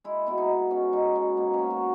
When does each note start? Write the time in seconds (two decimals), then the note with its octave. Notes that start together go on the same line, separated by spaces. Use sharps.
0.04 G#3 E4
0.27 B2 E4
0.38 D#4
0.49 G#3
0.71 B2 C#4
0.93 G#3 D#4
1.15 B2
1.37 G#2 A#3
1.54 C#4
1.59 F#3
1.70 F#4